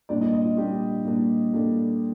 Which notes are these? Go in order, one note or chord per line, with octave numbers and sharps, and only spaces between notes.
A#2 G3 D4 D5
D#5
D#5
F4
A#2 G3 D4 G4
A#2 G3 D4
A#2 G3 D4 A4